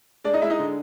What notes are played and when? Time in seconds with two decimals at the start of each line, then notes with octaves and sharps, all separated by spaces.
0.24 G#3 D4 D5
0.34 D#4 D#5
0.42 G#3 E4 E5
0.50 D#4 D#5
0.59 D3